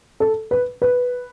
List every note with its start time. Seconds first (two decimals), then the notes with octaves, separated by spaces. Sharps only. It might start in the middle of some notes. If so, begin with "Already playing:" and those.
0.20 A4
0.51 B4
0.82 B4